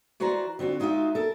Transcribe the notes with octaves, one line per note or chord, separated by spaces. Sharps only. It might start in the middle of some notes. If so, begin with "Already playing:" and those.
E3 F#4 B4 C5 D5 A#5
D3 C4 F4 F#4
G#3 D#4 F4 F#4 E5
A4 A#4